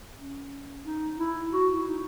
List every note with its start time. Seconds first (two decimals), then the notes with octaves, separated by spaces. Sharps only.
0.18 C#4
0.85 D#4
1.19 E4
1.52 F#4
1.73 E4
1.88 D#4